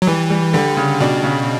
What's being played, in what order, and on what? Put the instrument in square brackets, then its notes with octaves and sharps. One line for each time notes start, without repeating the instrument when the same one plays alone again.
[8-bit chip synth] F#3
[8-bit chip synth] E3 [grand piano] G3
[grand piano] G3
[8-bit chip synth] D3 [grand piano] G3
[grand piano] C#3
[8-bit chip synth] B2 [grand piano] D4
[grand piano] C#3